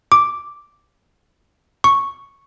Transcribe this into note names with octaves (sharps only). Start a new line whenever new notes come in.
D6
C#6